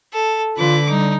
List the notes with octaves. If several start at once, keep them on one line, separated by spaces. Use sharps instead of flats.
A4
D3 F4 B4 D6
G3 D#4